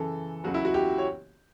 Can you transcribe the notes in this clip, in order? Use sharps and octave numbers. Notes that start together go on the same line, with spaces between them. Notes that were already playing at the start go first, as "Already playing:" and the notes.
Already playing: F#2 C#3 E3 A4
C#2 C#3 F#3 F#4
E4
F#4
G4
C#5